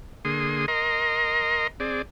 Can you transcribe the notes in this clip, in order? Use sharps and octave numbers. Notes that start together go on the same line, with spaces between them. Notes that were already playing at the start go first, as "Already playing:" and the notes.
D3 A#3 G#4 C6 D#6
A#4 D#5 A#5 C6
C4 G#4 D5